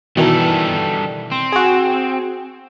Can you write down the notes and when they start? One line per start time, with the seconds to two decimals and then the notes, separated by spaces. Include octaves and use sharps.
0.17 B2 D#3 E3 G3 A4
1.32 C4
1.52 F#4 G#4